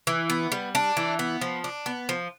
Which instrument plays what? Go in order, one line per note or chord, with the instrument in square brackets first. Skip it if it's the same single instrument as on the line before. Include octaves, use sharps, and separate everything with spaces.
[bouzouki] E3
B3
G3
D4
E3
B3
F3
D4
B3
F3